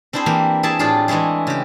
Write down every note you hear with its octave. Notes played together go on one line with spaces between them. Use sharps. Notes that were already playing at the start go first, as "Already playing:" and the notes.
C4 D4 E4 G#4 C5
E3 A#3 G4
E4 G#4 D5 E5 A5
A2 D4 F4 G4 G#4
E3 G#3 A3 E4 G#4
C#3 G4